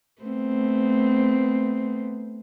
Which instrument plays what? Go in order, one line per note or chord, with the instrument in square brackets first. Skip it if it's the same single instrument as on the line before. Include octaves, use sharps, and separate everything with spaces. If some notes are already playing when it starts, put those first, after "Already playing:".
[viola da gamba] A3 B3 C4